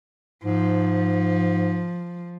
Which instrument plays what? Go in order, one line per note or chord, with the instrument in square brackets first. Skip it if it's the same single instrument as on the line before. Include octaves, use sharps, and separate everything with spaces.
[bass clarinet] G#2 [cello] F3